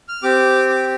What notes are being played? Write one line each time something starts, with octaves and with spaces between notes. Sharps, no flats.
F6
C4 G4 D6
D6